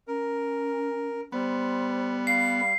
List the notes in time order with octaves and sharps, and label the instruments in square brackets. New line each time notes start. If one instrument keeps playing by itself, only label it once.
[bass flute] C#4 [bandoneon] A#4
[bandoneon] G3 [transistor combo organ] B3 [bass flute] C5
[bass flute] F5 [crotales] C7